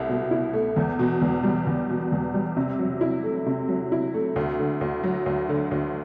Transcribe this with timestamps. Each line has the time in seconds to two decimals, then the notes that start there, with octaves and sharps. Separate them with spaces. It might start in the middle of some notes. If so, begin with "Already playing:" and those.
Already playing: C2 A3
0.09 B2
0.31 E4
0.54 A3
0.76 E2
0.99 B2
1.22 E2
1.43 G3
1.67 E2
1.90 B2
2.12 E2
2.34 G3
2.57 C3
2.79 F#3
3.01 E4
3.23 A3
3.46 C3
3.68 F#3
3.92 E4
4.14 A3
4.36 D2
4.59 D3
4.81 D2
5.04 F#3
5.26 D2
5.49 D3
5.71 D2